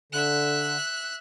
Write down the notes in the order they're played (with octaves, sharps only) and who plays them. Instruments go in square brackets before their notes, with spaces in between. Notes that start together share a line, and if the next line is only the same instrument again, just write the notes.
[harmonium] D3 [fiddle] E5 F#6